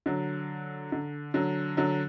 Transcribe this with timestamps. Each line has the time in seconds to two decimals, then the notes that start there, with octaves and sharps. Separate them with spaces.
0.06 D3 F#3
0.92 D3
1.34 D3 F#3
1.77 D3 F#3